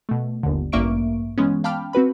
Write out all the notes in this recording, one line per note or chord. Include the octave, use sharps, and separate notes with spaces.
B2 A3
G1 D#2 D3
A1 G2 A#3 E5 C#6 D7
E3 G#3 B3 C#4
F5 G5 A5 B5 D6 F6
C4 F#4 B4 B5